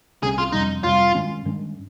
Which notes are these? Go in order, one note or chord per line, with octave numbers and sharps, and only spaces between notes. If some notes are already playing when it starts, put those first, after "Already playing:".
C2 C3 G3 C#4 G#4
F4
F2 C3 G3 D#4
F2 C3 G3 F4
G2 D#3 G#3 C#4
G2 D#3 G#3 C#4